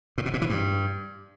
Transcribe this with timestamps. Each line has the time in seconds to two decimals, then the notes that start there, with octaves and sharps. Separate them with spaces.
0.18 A2
0.26 B2
0.34 A#2
0.42 E3
0.50 G2